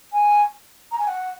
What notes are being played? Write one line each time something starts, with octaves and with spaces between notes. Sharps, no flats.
G#5
A#5
G#5
F#5